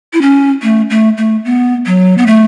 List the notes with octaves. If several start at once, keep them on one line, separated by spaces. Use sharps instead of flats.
E4
C#4
A3
A3
A3
B3
F#3
B3
A3